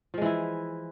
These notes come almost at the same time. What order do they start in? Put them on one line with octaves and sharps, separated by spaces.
F3 G#3 E3 E4